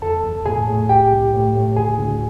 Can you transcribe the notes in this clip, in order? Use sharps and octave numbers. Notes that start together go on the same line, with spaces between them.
E2 A4 A5
E2
A2 G#4 G#5
A2
C2 G4 G5
C2
A2
A2
D2 G#4 G#5
D2